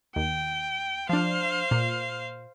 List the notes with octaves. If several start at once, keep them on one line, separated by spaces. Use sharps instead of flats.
D#2 G5
F3 D4 C5 F5
A#2